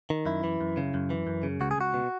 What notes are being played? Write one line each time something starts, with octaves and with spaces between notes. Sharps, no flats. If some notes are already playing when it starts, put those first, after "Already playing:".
D#3
F#2 E4
E3
F#2
C#3
F#2
E3
F#2
C#3
C#2 F#4
G#4
C#2 F#4
B2